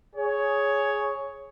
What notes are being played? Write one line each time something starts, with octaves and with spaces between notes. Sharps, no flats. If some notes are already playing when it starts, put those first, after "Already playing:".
G#4 C#5